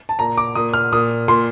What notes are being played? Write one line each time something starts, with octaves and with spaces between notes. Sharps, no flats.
A5
A#2 A#5
D6
A#2 D#6
F6
A#2 D#6
A#2 C6